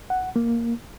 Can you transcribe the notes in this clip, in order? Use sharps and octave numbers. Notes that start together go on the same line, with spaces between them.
F#5
A#3